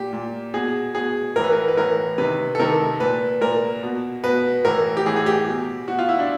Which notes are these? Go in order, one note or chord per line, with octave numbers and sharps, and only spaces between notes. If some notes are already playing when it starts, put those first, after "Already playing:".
Already playing: A#2 G4
A#2
B2 G#4
B2 G#4
A2 E3 A#4 B4
A#4
B4
A2 E3 A#4
C3 D#3 B4
A4
C3 D#3 A#4
A#2 B4
A#2 A#4
B2
B2 B4
A2 E3 A#4
G4
A2 E3 G#4
G#4
G4
B2
B2 F#4
F4
E4
D4